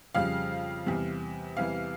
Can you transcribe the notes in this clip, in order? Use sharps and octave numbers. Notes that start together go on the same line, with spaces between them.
F2 C#3 G3 F5
E2 C3 G3
E2 C3 E3 G3 F5